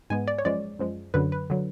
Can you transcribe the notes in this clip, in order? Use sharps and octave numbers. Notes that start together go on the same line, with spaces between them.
G#2 G#3 B3 G#5
D5
C#5
F#2 F3 G#3 D5
F#2 F3 G#3
F#2 D3 F#3 B4
B4
D3 F#3